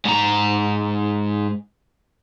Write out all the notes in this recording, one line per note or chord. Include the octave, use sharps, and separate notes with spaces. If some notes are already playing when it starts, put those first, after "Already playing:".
G#2 A#5